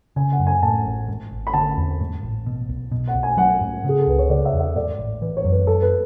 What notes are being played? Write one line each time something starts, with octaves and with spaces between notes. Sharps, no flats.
C#3 G#5
F#5
F#2
G#5
A2 A5
A1
G#2
G#1
B5
D3 A5
E2
G#2
A1
B2
B1
B2
F#5
B1
G#5
F#3 F#5
G#2
C#3 G#4
A4
C#2 B4
C#5
C#3 D5
E5
E2
E5
G#2 D5
A1
E3 B4
C#5
F#2
B4
F#2 A4
B4